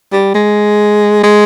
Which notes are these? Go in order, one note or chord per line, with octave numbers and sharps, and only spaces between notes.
G3
G#3
G#3